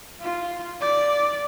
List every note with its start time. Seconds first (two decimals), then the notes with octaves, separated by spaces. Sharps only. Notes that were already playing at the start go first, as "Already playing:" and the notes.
0.21 F4
0.81 D5